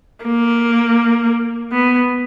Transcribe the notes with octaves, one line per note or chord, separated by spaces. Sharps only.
A#3
B3